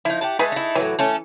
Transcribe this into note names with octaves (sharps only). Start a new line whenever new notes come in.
F3 D#4 E4
G4 F#5 A5
G#3 A3 G#4 B4
D#4 E4
A2 E3 F#3
A3 C#4 A4